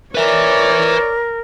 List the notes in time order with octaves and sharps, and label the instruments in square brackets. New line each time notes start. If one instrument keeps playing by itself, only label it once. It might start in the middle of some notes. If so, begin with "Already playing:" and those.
[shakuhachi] A#4 [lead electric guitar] B4 E5 [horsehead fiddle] C#5 D5